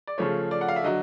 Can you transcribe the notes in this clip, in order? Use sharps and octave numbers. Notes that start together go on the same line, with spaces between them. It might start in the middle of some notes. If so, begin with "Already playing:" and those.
D5
C#3 F3 A3 C#5
D5
F#5
F5
E5
D3 F#3 D#5